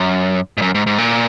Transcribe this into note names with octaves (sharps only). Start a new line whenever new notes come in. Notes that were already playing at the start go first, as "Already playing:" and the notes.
Already playing: F#2
G#2
F#2
G#2
G#2
A#2